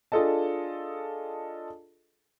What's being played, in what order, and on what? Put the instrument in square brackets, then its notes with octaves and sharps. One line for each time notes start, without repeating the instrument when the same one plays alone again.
[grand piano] D4 F4 G#4 A4 D#5 A5